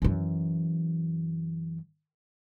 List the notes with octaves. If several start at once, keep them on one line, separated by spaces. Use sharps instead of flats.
F#2 E3